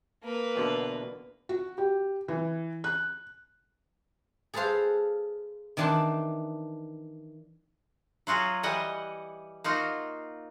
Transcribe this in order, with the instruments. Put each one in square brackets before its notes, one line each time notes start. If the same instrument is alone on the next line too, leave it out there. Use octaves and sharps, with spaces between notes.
[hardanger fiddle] A#3 B4
[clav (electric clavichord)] E2 B2 D3
[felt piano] F#4
G4
E3
F#6
[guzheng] G#4 A4 B4 C5 F5
D#3 E3 D4 A5 C6
[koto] F#3 F4 F#4 G#4
E3 G3 D#5 F#5
A#3 D#4 F4 F#4